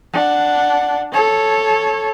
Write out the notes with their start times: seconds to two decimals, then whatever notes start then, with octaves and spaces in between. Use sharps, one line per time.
0.13 D4 F#5
1.12 A4 C#5